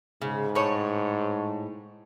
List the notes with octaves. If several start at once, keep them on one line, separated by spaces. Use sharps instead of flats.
G#2 C#3
A2 C#5